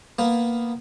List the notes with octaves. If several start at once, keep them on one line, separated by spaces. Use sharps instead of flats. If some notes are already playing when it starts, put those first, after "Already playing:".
A#3 B3